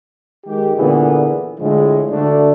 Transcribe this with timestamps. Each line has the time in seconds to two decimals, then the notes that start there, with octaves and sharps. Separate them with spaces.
0.46 D#3 G#3 G4
0.76 A#2 D3 E3 B3 G#4
1.60 A2 D3 F3 G#3
2.11 D2 D3 A3 D4